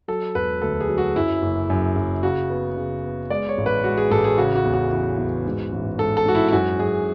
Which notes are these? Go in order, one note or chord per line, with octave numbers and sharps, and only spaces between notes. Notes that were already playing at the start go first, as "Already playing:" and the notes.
F#3 A4
E1 B4
D2 A4
G#4
F#3
F#4
F#2 E4
F#1
F#2
F#1
C#3 F#4
B3
C#3
B3
G#3 D5
C#5
A1
B4
G#3 F#4
G#4
A1 A4
G#4
C#3 F#4
F#4
E2
F#4
E3 F#4
E2
G#2
A1
G#2 A4
A4
G#2 F#4
E4
E4
F#2 F#4
F#2 G#4